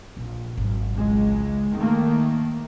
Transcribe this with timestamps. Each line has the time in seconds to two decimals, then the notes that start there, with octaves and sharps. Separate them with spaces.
0.17 A#1
0.57 G#1 F#3
0.93 C#2 G#3
1.75 D#3 A3 A#3 C4